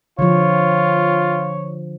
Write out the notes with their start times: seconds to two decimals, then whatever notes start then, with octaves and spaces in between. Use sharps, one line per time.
0.19 D3 F3 F4 C#5